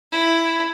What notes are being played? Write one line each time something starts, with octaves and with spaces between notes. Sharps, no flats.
E4